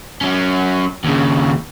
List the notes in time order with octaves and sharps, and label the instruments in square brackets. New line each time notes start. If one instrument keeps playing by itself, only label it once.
[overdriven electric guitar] F#3 C#4
D#2 C#3